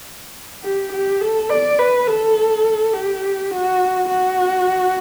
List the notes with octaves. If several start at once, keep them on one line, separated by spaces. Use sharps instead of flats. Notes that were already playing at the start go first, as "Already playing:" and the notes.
G4
G4
A4
D5
B4
A4
G4
F#4
F#4